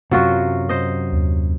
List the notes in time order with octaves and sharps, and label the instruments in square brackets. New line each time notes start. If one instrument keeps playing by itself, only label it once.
[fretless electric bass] F#2 C3 [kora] F#3 F4 F#4
[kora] C5 D#5
[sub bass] D#2